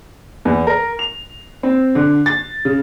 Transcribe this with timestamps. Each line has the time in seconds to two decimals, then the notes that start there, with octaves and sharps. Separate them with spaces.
0.45 E2
0.67 A#4
0.99 F7
1.63 C4
1.95 D3
2.26 A6
2.65 C#3